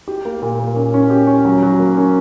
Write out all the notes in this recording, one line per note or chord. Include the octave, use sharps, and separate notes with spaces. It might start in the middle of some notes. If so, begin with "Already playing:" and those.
G4
A#3
A#2
A#3
C#4
C#4
G4
C#4
F#3
F#3
A#3
C#4